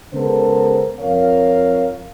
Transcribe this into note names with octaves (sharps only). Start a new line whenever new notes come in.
C#3 G#3 B3 A4 A#4 C5
F2 A#4 C#5 F5